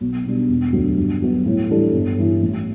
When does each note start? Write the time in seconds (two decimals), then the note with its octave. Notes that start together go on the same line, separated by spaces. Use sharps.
0.01 B1
0.25 B2 G3 D4
0.49 E1
0.73 D2 D3 F#3
0.98 G2
1.22 F#3 B3 F#4
1.46 A2
1.70 E3 G3 D4 A4
1.93 G1
2.18 G2 E3
2.42 A1